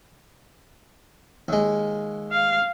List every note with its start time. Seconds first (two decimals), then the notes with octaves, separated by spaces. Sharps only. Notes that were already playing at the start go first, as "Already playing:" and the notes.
1.48 D#2 G#3
2.32 F5